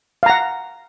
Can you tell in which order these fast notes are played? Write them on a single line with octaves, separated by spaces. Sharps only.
F5 A#5 F#5